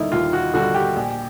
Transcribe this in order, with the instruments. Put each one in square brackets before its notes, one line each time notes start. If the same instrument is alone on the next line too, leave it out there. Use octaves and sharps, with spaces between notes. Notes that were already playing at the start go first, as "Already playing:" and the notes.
Already playing: [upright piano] D#2 D3 G3 D#4 E4
D#2 F4
F#4
D3 G3 F#4
G4
A#1